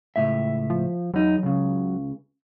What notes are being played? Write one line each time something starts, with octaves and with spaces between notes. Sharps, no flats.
C#2 A2 E5
F3
E2 F#3 D#4
C#2 C#3